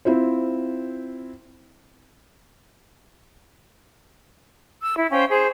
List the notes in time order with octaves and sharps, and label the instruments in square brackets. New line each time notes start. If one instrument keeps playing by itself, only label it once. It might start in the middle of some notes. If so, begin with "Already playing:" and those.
[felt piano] C4 E4 F4 C5
[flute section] E6
E4
C#4 C5 F5 G5
G#4 C5